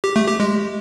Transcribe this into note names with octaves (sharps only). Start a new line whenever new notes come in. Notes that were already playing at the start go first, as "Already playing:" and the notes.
G4
A3
G4
G#3